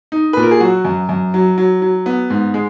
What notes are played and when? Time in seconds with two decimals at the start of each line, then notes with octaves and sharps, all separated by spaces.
0.12 D#4
0.33 A#2 B4
0.42 A#4
0.51 G#4
0.60 F#3 F#4
0.85 F#2
1.09 F#2
1.34 F#3
1.58 F#3
1.82 F#3
2.06 B3
2.30 G#2
2.54 G#3